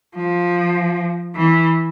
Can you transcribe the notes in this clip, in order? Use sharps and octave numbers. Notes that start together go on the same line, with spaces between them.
F3
E3